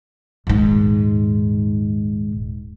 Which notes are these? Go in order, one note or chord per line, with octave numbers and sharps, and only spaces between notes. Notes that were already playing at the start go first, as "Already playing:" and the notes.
D#1 G#2